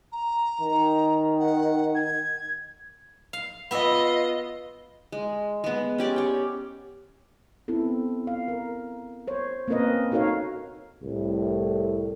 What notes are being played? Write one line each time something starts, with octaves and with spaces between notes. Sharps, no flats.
A#5
D#3
F#5
G#6
F5
B3 F4 D#5 E5
G#3
G#3 B3
C#4 G4 D5
C#5 G5
B3 C4 E4 A4
F5
A#4
C5 C#5
A#3 C4 C#4 A#4 B4 D#5
D#4 F#4 A4 A#4 C#5 F5
C2 A2